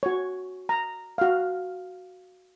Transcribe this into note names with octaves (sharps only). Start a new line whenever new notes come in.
F#4 C#5
A#5
F#4 F5